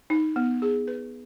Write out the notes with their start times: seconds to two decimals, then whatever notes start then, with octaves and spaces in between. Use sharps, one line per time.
0.10 D#4
0.36 B3
0.62 G#4
0.87 B4